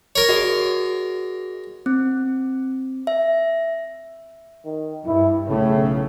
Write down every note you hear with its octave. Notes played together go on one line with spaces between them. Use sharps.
A#4 C#5
F#4 G#4 D#5
C4
E5
D#3
G2 E4
B1 A2 C#3 A3